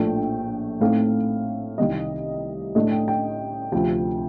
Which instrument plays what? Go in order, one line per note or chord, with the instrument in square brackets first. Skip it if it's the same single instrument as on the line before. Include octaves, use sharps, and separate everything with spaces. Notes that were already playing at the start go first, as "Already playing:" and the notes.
Already playing: [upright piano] A#1 A2 F3 A3 D4 G5
A2 A3 C4 D#4 F5
C2 C3 D#3 G3 D#5
A2 A3 D4 D#5
G5
G5
D2 C3 F3 G5